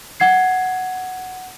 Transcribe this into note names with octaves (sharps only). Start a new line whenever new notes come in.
F#5 G#6 C7